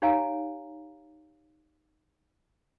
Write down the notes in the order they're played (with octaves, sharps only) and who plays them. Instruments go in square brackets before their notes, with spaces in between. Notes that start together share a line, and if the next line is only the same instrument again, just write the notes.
[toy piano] D#4 G4 C#5 F5 G#5 A#5